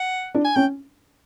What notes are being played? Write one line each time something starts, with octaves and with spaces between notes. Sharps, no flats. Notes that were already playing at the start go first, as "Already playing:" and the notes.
Already playing: F#5
D4
G#5
C#4 G5